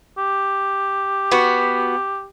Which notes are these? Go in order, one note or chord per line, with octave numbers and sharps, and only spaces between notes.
G4
B3 F#4